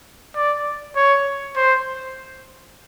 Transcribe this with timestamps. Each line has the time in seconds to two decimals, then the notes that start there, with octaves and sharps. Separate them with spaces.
0.36 D5
0.96 C#5
1.56 C5